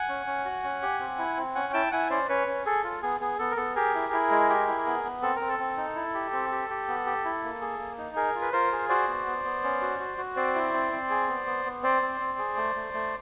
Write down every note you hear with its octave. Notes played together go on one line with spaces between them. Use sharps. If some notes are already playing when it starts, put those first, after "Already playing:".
Already playing: F#5 G#5
C#4
C#4
F#4
C#4
G4
C4
E4
C4
C#4 F#5 G#5
E4 G5 A5
E4 F#5 G#5
C#4 C5 D5
C#4 B4 C#5
C#4
G#4 A4
F4
B3 G#4
B3 G#4
B3 A4
A#4
B3 A4
G4 G#4 A#4
E4
E4
G#3
G4
E4
B3
B3
C4 A4
A#4
C4
A4
C4
D#4
E4
G4
C4
G4
G4
B3
G4
E4
A#3
G#4
A#3
D#4
G#4 A#4
F4
B4
F4 A#4 C5
G#4
F#4 C5 D5
B3
B3
B3
C#4
F#4
F#4
F#4
C4 C5 D5
E4
C4
C4
G#4
B3
B3
B3
C4 C5 D5
C4
C4
G#4
A3
A3
A3